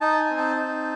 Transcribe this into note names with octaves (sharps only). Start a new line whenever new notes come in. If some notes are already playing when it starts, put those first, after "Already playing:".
D#4 A5
G#5
C4
A5
D#4